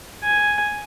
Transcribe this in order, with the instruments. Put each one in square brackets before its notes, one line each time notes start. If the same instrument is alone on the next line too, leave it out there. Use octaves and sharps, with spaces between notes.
[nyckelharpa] G#5